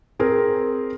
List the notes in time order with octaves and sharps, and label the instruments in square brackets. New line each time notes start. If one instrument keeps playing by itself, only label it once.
[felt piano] C4 G#4 A#4